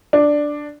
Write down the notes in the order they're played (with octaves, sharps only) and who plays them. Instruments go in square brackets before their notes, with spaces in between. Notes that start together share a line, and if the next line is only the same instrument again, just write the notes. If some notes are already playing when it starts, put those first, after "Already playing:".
[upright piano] D4